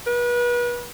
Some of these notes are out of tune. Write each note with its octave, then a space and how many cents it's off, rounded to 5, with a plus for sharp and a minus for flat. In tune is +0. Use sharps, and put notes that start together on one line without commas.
B4 -35